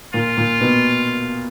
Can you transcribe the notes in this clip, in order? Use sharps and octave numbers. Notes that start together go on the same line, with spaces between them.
A#2 F4
A#2
B2